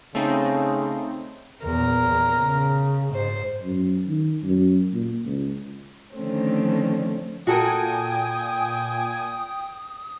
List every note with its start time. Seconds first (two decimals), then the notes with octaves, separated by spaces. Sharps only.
0.15 C#3 A3 C4 D#4
1.65 E2 A#2 A#4
2.41 C#3
3.14 G#2 C5
3.62 F#2
4.08 D#3
4.44 F#2
4.93 A#2
5.26 C#2
6.15 D3 D#3 F3 A3 C4 C#4
7.47 A#2 F#4 A4 A#4 G5 G#5 D#6